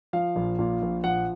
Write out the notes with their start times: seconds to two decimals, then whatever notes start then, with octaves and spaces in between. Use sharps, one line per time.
0.13 F3 F5
0.36 A#1
0.59 A#2
0.82 A#1
1.04 F3 F#5